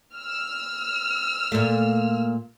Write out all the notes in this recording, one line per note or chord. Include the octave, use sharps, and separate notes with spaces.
E6 F6
A#2 A3